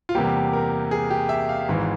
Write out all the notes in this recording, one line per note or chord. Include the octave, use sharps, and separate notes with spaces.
F4
E2 C3 G3 A#3 G4
A#4
G#4
G4
E5
F5
G#1 G#2 E3